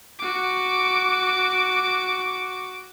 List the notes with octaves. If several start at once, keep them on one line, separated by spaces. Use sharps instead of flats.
F#4 D6